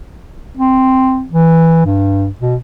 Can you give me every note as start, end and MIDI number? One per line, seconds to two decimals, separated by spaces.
0.57 1.25 60
1.32 1.82 52
1.86 2.28 43
2.40 2.55 47